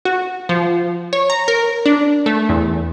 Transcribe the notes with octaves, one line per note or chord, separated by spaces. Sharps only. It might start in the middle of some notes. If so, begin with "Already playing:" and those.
F#4
F3
C#5
A#5
A#4
D4
A3
E2